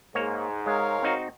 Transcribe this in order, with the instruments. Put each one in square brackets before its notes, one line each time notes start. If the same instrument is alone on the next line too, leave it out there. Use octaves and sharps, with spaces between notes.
[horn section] G#2 [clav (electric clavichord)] A#3 C#5
[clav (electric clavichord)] G#3 [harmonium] A#4 C#5 F5
[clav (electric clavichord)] C4 D#4 F#4